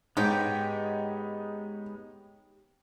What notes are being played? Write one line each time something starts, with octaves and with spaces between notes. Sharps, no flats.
G#2 G#3 B3 D#4 G4 C#5 D#5 G5